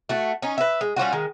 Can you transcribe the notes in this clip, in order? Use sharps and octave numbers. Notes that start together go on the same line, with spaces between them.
A3 F#4
C#4 D#4
B4 E5
G#3
G3 C#4 F4 F#4
D#3 G#3